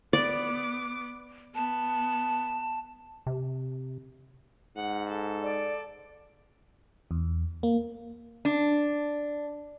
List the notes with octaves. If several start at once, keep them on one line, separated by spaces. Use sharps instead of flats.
B3 D5 D6
B3 A5
C3
G#2 F#5
A4
D5
E2
A#3
D4